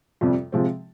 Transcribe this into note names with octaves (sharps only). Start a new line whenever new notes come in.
F2 C3 G3
C3 F3 G#3 C4